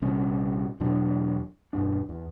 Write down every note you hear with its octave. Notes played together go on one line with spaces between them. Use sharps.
A#1 C3 G3 C#4
E2 B2 F#3 D4
E1 G2 D4
E2